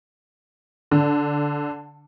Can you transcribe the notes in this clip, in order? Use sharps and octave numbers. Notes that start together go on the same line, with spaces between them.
D3